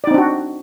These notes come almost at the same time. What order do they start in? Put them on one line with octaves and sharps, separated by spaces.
D5 D#4 C4 D4 F#4